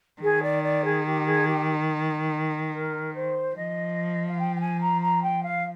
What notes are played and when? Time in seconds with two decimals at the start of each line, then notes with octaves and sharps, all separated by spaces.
0.22 D#3 G#4
0.42 D5
0.63 D5
0.84 G#4
1.06 G4
1.26 G#4
1.47 G4
2.72 A#4
3.14 C5
3.55 F3 D#5
4.28 F5
4.38 G5
4.55 G5
4.60 G#5
4.80 A#5
5.01 A#5
5.22 G5
5.43 F5